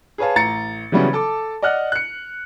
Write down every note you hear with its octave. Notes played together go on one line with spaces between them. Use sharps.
G#4 B4 C#5 F5 A5
A1 A#5 A6 C#7
C#3 E3 F#3 G3 B3 C#4
A4 A5 D6
D5 D#5 F#5 F6 F#6
F#6 C#7